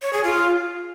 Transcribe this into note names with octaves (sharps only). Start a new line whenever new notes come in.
C#5
G#4
F4